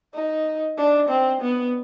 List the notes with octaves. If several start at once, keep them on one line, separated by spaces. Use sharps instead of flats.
D#4
D4
C4
B3